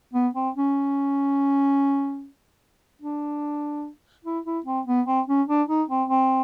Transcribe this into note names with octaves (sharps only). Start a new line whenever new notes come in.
B3
C4
C#4
D4
E4
E4
C4
B3
C4
C#4
D4
D#4
C4
C4